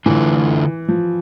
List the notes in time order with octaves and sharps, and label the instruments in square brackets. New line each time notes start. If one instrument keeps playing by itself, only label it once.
[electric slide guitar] D3 A3 D4 F4 A4 [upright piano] E3
[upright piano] F3